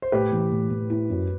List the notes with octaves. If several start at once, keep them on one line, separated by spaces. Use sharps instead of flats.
C5
A2 G4 B4
E3
A2
A2
E4
F#2